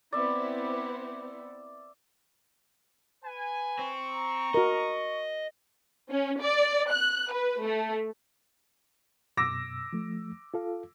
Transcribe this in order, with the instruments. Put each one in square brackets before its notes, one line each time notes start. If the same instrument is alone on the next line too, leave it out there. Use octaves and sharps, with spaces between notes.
[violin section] B3 C4 E4 [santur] D5 E5
[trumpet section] B4 G#5
[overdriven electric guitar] C4 [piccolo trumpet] C#6
[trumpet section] A#5
[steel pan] F#4 A#4 [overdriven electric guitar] D#5
[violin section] C#4
D5
F#6
B4
A3
[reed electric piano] F#2 B2 [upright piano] D6 E6 A#6
[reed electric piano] F3 A3
F4 A4 F5